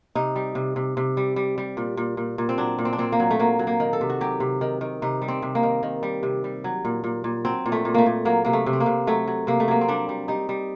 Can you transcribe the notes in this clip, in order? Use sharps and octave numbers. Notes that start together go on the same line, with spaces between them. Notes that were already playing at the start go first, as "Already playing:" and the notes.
C3 D#4
G3
C3
C3
C3
G3
G3
G3
A#2
A#2
A#2
A#2
C4
F#3 D4
A#2
C4
D4
A#2 C4
A#3
F#3
A3
F#3 A#3
F#3
A#3
D#3
A4
C3
F#4
F#3 G4
C3
D#3
D#3
C3 D#4
G3
C4
C3
A#3
D#3
D#3
G3
C3
G3
F#3
A#2
A#2
A#2
F#3 C4
A#2
A3
A#2
A3 A#3
A#2
F#3 A#3
C3 A#3
A3
C3
C4
A#3
C3
F#3 A3
F#3
C3 A#3
A3
F#3 A#3
C4
G3 D4
G3
G3 D#4
G3